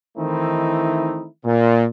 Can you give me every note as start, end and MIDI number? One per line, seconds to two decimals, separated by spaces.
0.18 1.26 51
0.18 1.26 52
0.18 1.26 57
0.18 1.26 60
0.18 1.26 63
0.18 1.26 64
1.45 1.85 46